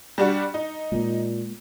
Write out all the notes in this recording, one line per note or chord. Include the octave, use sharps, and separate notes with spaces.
G3 D4 F#4
D#4
A#2 G#3 A#3